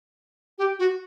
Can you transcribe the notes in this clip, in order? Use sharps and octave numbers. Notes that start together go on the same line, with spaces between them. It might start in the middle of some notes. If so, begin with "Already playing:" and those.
G4
F#4